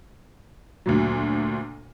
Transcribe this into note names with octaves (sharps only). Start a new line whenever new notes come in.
D2 A#2 F#3